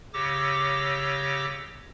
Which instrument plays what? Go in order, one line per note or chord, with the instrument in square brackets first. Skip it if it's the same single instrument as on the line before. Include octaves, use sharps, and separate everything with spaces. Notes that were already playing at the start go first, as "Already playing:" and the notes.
[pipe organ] C#3 G4 C#5 D6 E6 A#6